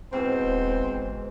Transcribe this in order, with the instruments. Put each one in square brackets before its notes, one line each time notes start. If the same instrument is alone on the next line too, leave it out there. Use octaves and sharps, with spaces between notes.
[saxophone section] E2 C4 [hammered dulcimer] G#2 B2
[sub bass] D#1
G1